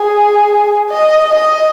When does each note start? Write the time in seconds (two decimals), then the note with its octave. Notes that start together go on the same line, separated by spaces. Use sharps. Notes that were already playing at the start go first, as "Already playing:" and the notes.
Already playing: G#4
0.90 D#5
1.35 D#5